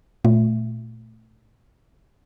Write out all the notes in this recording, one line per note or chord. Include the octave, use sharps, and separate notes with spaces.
A#2 A3